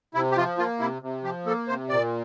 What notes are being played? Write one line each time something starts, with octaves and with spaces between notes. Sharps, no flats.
C3 E4
G4
F3 F4
A#3 F4
C3 E4
C3
F3 G4
A#3 A4
C3 C5
A#2 D5